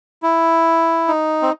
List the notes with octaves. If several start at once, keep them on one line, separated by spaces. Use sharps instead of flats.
E4
D#4
C4